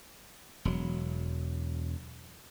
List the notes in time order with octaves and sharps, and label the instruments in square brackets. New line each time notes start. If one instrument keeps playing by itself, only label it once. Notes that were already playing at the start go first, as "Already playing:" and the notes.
[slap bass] E1 F#3